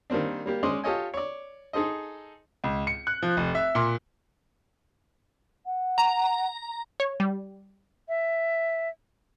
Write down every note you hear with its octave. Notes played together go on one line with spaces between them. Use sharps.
D#3 G3 A#3 C4 D4
G3 A#3 G4
G#3 C#4 C5 D5 D#5 C6
F4 G4 A4 C#5 D#5 G#5
C#5 D5
D#4 G#4 A4 C5 D#5
C#2
C#7
F#6
F3
F1
E5
A#2
F#5
A#5
C#5
G3
E5